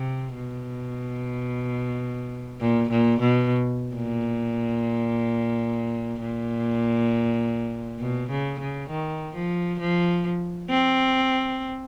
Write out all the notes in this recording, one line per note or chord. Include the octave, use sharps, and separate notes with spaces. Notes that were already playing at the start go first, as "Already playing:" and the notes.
Already playing: C3
B2
A#2
A#2
B2
A#2
A#2
B2
C#3
C#3
D#3
F3
F3
C4